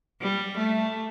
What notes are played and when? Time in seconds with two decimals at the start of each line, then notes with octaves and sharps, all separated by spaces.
0.22 G3
0.58 A3